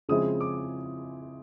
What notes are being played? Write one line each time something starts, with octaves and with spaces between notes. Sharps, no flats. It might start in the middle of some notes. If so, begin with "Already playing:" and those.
C#3 F3 G#3 C4 E4 D#6
D6